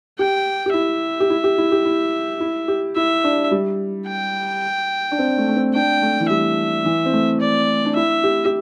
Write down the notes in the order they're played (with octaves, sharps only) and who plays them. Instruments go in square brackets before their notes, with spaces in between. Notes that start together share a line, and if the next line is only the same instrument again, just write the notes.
[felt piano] G4 [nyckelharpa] G5
[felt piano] G4
[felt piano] E4 [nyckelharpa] E5
[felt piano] G4
E4
G4
E4
G4
E4
E4
G4
[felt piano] E4 [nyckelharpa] E5
[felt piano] D4
G3
[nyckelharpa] G5
[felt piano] D4
C4
A3
A3
C4
[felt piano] D4 [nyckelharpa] G5
[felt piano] A3
E3
[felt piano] G3 [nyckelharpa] E5
[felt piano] E3
C4
A3
[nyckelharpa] D5
[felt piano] D4
[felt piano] E4 [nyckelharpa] E5
[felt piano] G4
G4